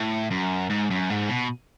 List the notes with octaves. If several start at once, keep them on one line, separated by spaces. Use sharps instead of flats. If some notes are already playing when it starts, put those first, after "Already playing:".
Already playing: A2
F#2
G#2
F#2
G#2
B2